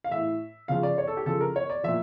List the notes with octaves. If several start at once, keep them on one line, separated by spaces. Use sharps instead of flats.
F5
A2 E3 E5
C#3 F3 F5
D5
C#5
A4
G4
C#3 F3 A4
A#4
C#5
D5
A#2 F3 E5